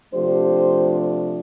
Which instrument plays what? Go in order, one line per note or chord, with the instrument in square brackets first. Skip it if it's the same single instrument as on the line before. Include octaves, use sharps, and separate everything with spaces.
[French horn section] C3 F3 A3 D4 G4 C5